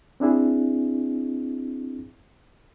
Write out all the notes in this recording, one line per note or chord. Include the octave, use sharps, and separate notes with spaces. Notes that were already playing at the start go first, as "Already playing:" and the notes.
C4 D4 E4 G#4